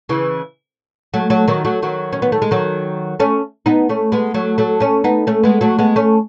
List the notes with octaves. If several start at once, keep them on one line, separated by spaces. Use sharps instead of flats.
C#3 E3
F#3 A3
F#3 A3
D#3 F#3
F#3 A3
D#3 F#3
C#4
B3
A3
G#3
D#3 F#3
A3 C#4
B3 D#4
A3 C#4
G#3 B3
F#3 A3
F#3 A3
A3 C#4
B3 D#4
A3 C#4
G#3 B3
F#3 A3
G#3 B3
A3 C#4